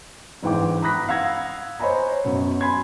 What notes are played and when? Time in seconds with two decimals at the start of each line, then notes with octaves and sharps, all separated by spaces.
0.43 G1 G#2 E3 G5 D6
0.82 A#5 B5 D#6 F#6 A#6 B6
1.08 F5 F#5 E6 G#6 A#6
1.80 C5 C#5 D#5 G#5 A#5 B5
2.24 F#2 B2 C#5
2.61 G#5 B5 C6 G#6